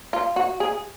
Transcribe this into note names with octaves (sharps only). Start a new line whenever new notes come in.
F4
F#4
G#4